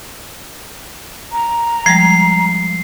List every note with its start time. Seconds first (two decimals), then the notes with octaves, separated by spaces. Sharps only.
1.32 A#5
1.86 F3 G3 G#3 C7